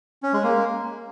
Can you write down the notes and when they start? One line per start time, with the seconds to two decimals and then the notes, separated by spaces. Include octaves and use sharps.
0.23 C#4
0.33 G#3
0.43 A#3